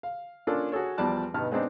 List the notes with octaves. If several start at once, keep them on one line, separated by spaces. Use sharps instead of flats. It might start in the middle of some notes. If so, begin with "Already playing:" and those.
F5
A#3 C#4 D4 F4 A4
F#4 G#4 A4 C#5
E2 F3 G3 D5 A5 F#6
G2 B2 B3 D#4 A5 F6
G#3 B3 C4 D4 D#4